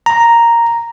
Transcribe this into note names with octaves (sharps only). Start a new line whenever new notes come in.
A#5